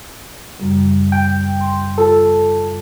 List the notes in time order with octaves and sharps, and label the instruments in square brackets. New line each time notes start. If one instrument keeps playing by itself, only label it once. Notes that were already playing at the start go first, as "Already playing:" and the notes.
[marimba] F#2 C#3 G3
[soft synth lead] G5
[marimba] C6
[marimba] F4 [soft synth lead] A4